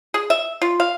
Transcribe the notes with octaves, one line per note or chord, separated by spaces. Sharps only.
G#4
E5
F4
F5